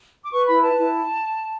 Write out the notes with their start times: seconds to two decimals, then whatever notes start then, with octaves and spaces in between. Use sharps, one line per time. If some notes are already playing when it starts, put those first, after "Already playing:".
0.24 D6
0.32 B4 C#6
0.47 E4 B5
0.62 B4 A5
0.77 E4